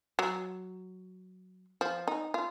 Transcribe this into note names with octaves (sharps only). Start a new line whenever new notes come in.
F#3
F3
D#4
F4